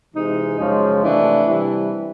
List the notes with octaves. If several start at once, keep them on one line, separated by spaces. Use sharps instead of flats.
C3 E3 G#3 D#4
F#2 C#3 F3 G#3
C3 E3 A3 D4
C3 E3 G3